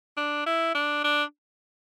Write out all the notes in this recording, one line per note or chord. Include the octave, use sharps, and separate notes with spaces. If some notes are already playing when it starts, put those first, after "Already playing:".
D4
E4
D4
D4